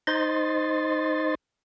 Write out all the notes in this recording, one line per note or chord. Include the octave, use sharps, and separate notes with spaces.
D#4 C5 D#5 C6 A6